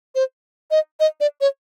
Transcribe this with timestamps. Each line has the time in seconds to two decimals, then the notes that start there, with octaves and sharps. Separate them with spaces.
0.15 C5
0.71 D#5
1.00 D#5
1.20 D5
1.41 C#5